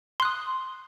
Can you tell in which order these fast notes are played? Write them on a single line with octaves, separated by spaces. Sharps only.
C6 F#6 D#6